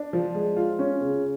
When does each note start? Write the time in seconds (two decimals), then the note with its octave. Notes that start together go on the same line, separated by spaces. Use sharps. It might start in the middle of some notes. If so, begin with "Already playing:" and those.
Already playing: D4
0.13 F3
0.35 G#3
0.57 F4
0.79 C#4
1.01 C#3